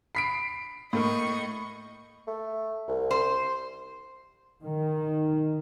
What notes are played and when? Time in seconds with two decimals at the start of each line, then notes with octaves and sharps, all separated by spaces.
0.15 B5 B6 C7 D7
0.93 A2 A#3 A4 A#4 D#5 C#6
2.27 A3
2.88 C2
3.11 C5
4.65 D#3